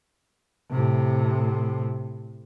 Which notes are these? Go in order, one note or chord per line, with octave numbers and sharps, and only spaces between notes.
A2 C3